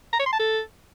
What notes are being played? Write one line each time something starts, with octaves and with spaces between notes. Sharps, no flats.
A#5
C#5
C6
A5
A4